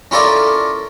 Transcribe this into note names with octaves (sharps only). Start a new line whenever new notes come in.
C#4 E4 F4 A4 A#4 D5